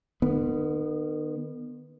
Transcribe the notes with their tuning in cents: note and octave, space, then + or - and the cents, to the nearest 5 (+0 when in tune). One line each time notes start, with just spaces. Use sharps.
D#3 -40 B3 +0